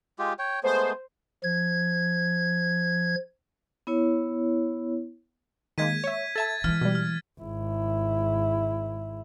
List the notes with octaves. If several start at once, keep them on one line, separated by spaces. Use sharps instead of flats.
G#3 F4 G4
C#5 G5
G#3 A3 B3 C5
F3 G#6
B3 E4 C#5
D#3 G#3 A#3 G#6 B6 D#7
C#5 E5
A4 E5 A5 A6
E3 G#3 F6
B2 G3
F6
G#1 E4